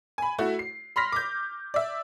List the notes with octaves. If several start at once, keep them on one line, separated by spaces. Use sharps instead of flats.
G#5 B5
A3 E4 F#4
C7
B5 C6 F6 A#6 B6
D6 G6
D5 E5